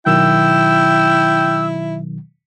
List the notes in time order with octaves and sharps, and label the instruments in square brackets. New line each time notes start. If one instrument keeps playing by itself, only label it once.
[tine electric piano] B2 D#3 F#3 [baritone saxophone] E4 [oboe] G5 [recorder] E6